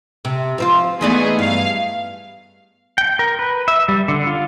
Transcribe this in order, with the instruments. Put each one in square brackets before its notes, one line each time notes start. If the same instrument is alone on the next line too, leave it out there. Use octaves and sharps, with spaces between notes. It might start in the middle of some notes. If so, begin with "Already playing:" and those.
[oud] C3
F3 C4 F4
[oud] E3 D#4 D5 [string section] A3 B3 G#4
[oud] G2 [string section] F5
[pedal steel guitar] G5
A#4
B4
E5
G3
D3
F4